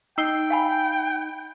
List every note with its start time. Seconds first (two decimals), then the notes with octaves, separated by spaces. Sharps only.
0.18 D#4 G5 E6 C7 G7
0.50 F5 G#5 B5